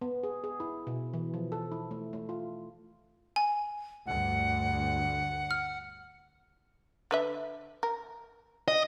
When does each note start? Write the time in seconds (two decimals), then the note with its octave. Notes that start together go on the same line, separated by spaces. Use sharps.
0.01 B3
0.23 G#4
0.44 G#4
0.60 E4
0.87 B2
1.14 E3
1.34 F3
1.52 A4
1.72 E4
1.91 A3
2.13 A3
2.29 F4
3.36 G#5
4.07 D2 G2 F#5
5.51 F6
7.11 D3 B4 E5
7.83 A#4
8.68 D#5